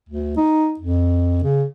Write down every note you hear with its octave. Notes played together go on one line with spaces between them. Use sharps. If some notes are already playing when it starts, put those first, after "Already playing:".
D2
D#4
F2
C#3